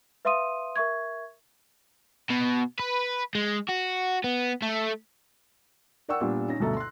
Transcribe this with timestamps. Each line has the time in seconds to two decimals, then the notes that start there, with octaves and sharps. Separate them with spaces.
0.25 B4 E5 F5 C6 D#6 D#7
0.76 A#4 E5 C#6 G#6
2.30 B2
2.80 B4
3.35 G#3
3.69 F#4
4.24 B3
4.62 A3
6.09 A#4 D5 F#5 G5 C#6 E6
6.21 A#2 G3 B3 D4
6.48 C#4 D#4 A#6
6.60 D2 G2 B2 A4 E5 A#5
6.77 C6 F#6